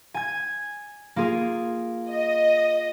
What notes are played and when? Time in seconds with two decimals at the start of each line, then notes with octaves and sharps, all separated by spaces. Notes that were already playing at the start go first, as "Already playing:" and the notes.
0.14 G#5 G#6
1.16 A#3 F4 G#4
2.09 D#5